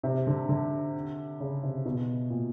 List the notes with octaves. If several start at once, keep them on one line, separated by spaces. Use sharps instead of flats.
C3
D3
D3
C#3
C3
B2
A#2